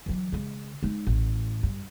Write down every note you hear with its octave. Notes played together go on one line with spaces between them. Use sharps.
E3 F#3
C#3 G#3
G#3 D#4
A1
G2